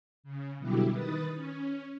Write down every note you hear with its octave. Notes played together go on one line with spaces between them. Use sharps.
C#3
B2 D3 F#3 G3 E4 G4
D#3 B4 D#6 A6
C#4